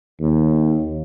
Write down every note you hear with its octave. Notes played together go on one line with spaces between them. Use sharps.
D#2